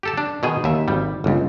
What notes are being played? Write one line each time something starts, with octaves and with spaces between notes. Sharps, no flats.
G4 A4 A5
D4
B2 D#3 G#4
D#2 E5
G#1 G3
G1 C#2